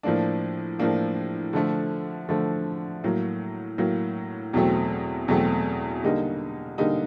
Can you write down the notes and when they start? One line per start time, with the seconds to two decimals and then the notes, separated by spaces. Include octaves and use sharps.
0.03 A2 F3 A#3 D4
0.79 A2 F3 A#3 D4
1.53 D3 F3 A3
2.29 D3 F3 A3
3.04 A2 F#3 A#3
3.78 A2 F#3 A#3
4.53 E2 B2 F#3 A3 C4
5.28 E2 B2 F#3 A3 C4
6.04 D3 G3 A#3 D#4
6.78 D3 G3 A#3 D#4